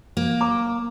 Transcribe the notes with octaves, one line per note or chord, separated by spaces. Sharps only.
A#3
A#5 D6